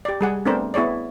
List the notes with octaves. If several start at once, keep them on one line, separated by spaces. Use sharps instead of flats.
G4 D5
G3 G#4 F#5
A3 B3 C4 D4 A#4 C5
B3 E4 G#4 C#5 D5